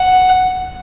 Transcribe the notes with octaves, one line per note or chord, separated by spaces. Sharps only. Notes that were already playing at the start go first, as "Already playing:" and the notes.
Already playing: F#5